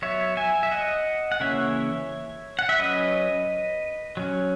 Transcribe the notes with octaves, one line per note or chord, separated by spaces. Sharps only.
F#3 B3 C#5 E5
E5 G#5
E5
D#5 F#5
F#5
C#3 E3 A#3 C#4 C#5 E5
F#5
E5
F#3 C#4 B4 D#5
F#3 C#4